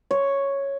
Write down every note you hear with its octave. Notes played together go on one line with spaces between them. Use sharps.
C#5